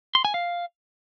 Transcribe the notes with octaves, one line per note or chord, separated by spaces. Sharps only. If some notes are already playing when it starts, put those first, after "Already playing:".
C6
G#5
F5